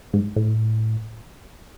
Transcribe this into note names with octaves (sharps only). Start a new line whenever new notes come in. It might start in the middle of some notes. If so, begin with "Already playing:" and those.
G#2
A2